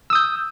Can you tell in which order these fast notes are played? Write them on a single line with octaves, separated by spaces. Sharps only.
E6 D#6 G6